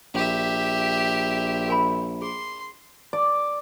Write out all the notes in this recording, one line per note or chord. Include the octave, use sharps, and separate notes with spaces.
A#1 G4 E5
A#4 G#5 B5
G#4 C6
D5